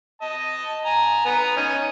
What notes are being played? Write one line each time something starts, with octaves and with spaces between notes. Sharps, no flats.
D#5 A5
G#5 A#5
B3 F#5 A#5
C#4 D#4 G#5